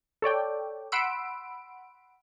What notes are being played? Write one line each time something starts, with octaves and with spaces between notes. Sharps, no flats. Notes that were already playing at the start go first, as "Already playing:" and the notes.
A4 C#5 D5 G5
F#5 B5 C6 E6 D7